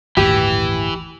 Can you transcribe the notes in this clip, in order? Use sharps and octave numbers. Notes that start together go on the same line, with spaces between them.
G1 D#2 A2 E3 G4